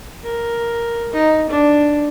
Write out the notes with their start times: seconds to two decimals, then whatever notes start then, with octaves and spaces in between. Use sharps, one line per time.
0.24 A#4
1.14 D#4
1.50 D4